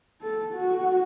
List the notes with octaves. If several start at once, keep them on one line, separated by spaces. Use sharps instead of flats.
A4
F#4